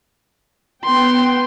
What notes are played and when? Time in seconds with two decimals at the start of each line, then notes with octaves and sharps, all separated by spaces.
0.85 B3 G5 C6